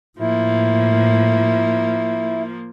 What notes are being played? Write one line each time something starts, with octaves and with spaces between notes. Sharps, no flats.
A2 F3 A#3 E4